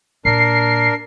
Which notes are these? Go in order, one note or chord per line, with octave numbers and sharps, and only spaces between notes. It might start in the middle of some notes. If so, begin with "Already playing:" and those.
A#2 D4 A#4 C7